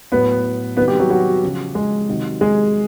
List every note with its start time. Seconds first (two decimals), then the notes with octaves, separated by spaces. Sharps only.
0.12 A2 F#3 B3 B4
0.77 C3 D#3 F#3 B3 B4
0.88 G3 G4
0.99 F#3 F#4
1.10 F#3 F#4
1.43 C#3 F3
1.75 G#3 G#4
2.08 C3 D#3 F#3
2.41 G#3 G#4